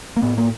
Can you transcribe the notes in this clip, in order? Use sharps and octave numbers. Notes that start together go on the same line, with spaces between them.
A#3
A2 B3
A#3